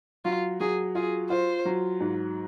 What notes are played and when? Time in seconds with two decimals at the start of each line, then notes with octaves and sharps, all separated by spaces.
0.25 F#3 F4
0.60 F#3 G#4
0.95 F4 G#4
1.30 F4 C5
1.65 F#3
2.00 G#2